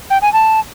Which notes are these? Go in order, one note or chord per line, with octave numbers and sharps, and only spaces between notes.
G5
G#5
A5